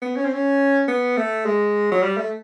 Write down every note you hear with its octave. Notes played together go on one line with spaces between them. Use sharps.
B3
C#4
C4
C#4
B3
A3
G#3
F#3
G3
A3